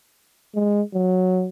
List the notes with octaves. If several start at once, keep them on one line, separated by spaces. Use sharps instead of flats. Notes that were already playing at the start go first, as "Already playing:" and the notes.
G#3
F#3